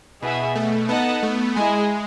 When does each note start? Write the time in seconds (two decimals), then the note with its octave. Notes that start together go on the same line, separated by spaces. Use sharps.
0.21 B2 B3 E4 G#4 B4 E5
0.55 A3
0.89 B3 D#4 A4 D#5 F#5 A5
1.23 A3
1.56 G#3 E4 G#4 D#5 G#5